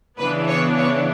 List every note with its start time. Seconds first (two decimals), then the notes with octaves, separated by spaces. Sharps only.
0.19 C#3 E3 B3 D4 B4
0.48 C#5
0.78 C#5